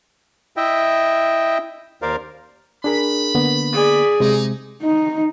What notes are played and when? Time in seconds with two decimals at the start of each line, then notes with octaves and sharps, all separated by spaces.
0.57 E4 D#5 E5 G5
2.02 D#2 A#4 C5 D5 F5
2.84 D4 G#4 A#4 B5
3.35 D3 A#3 B3
3.73 G#4 D5
4.20 C3 G#3 D#4
4.82 D#4